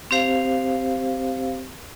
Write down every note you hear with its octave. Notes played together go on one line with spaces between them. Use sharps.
C4 G4 C5 F5